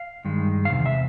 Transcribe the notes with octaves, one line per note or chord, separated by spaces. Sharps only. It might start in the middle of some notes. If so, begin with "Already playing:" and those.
Already playing: F5
G2 D#3 G#3
F5
E2 C3
E5